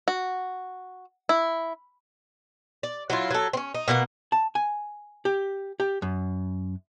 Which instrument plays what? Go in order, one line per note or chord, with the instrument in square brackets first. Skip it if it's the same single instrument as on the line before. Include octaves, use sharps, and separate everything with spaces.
[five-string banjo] F#4
E4
[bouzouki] D5
F#3 E4 F4
F#3 A4
C4 C#4
D#4
B2 A#3 G#4 F#5
[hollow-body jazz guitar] A5
G#5
G4
G4
F#2